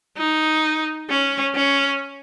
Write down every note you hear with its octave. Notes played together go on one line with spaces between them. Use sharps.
D#4
C#4
C#4